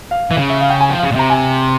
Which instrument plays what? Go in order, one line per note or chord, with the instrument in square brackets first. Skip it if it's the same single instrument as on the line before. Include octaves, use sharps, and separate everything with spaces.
[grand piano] F5
[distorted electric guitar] E3
C#3
[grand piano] E5
F5
G5
G#5
[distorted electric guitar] F3 [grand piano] G5
[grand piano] F5
[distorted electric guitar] C#3
A#2
[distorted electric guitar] C3 [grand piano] A#5
[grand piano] G#5